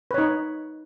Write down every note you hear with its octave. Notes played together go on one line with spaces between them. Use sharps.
D#4 B4 C#5